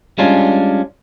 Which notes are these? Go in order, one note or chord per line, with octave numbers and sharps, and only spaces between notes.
G3 G#3 C#4 D4 F4